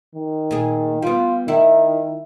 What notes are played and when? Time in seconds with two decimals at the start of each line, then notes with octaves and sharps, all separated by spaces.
0.15 D#3
0.51 A#2 G#4
1.02 G3 B3 F4
1.48 D#3 E4